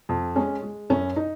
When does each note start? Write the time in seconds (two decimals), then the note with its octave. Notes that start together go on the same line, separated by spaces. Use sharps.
0.09 F2
0.35 G#3 C#4
0.63 G#3
0.90 F#2 C#4
1.16 D#4